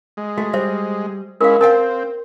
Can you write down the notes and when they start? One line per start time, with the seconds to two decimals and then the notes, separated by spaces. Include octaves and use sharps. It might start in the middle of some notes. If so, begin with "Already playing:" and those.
0.17 G#3
0.38 A3 F#4
0.54 G3 C5 E5
1.41 G#3 C#4 E4 A#4 F5
1.61 C4 A#4 F5 G5 A5